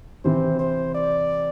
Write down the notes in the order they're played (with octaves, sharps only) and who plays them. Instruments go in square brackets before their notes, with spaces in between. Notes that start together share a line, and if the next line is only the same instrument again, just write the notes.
[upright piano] C3 E3 C4 [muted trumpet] C5
[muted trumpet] C5
D5